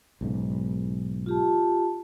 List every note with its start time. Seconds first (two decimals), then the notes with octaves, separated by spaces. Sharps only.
0.21 B1 G#2 C#3
1.26 F4 G4 A5